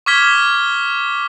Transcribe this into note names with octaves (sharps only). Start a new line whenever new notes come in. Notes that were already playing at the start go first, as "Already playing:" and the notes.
C#6 D6 F6 G#6 B6 G7